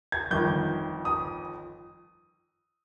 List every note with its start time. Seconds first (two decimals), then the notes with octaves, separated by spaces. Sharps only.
0.12 G#6
0.31 G1 F2 D#3 G6
1.05 D#6